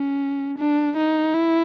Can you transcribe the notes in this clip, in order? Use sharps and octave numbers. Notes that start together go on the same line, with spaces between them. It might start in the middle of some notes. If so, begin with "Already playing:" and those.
Already playing: C#4
D4
D#4
E4